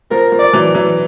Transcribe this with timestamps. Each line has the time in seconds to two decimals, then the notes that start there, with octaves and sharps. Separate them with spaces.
0.11 F3 A#4
0.32 F3
0.39 D5
0.53 E3 F#3
0.74 E3 F#3